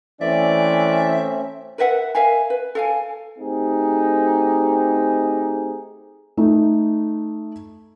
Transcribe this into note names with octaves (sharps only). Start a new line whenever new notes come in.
E3 A3 C4 C#4 D5 E5
A#4 B4 E5 F#5
A#4 E5 F5 G#5
B4
A4 F5 G#5
A3 C4 D#4 G4 G#4
A3 D#4